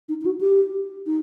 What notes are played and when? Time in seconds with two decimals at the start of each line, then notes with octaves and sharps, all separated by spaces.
0.09 D#4
0.21 D#4
0.26 F#4
0.41 G4
1.06 D#4